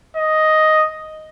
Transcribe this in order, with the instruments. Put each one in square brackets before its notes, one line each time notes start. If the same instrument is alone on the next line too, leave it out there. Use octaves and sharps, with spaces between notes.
[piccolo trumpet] D#5